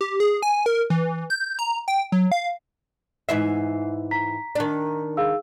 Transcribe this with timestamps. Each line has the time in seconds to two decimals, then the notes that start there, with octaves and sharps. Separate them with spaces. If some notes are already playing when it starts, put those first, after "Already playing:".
0.01 G4
0.20 G#4
0.42 G#5
0.66 A#4
0.90 E3
1.30 G6
1.59 A#5
1.88 G5
2.12 F#3
2.32 F5
3.29 G#2 E3 E5 C7
4.11 A#5 B6
4.55 D#3 D4
5.17 G#4 F5 E6